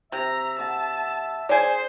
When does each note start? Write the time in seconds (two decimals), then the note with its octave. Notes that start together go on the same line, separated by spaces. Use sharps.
0.12 C3 E5 A#5
0.58 F#5 A5 E6
1.49 G#4 C5 D5 G#5